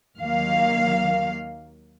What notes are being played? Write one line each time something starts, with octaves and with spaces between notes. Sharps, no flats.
D#2 D#3 F#3 A#3 F5